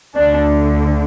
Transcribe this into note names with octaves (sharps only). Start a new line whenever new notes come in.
D2 D3 D4